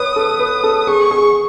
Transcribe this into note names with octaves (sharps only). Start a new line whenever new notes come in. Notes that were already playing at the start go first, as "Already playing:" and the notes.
Already playing: B4 C#5 D#6
A4
B4
A4
G#4 C#6
G#4